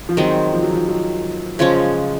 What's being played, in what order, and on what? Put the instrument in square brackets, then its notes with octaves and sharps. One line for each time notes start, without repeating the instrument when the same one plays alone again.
[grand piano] F3
[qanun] D#3 G#3 C4 [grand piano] F#3
[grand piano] F3
F#3
F3
F#3
[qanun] C#3 F3 G#3 C#4